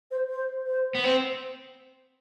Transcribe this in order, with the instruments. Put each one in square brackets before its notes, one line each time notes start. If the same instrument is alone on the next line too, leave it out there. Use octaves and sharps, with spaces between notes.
[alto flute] C5
C5
C5
[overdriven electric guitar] B3
[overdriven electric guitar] C4 [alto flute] C5